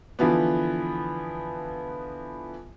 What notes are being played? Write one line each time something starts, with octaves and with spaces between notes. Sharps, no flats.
D3 E3 F3 B3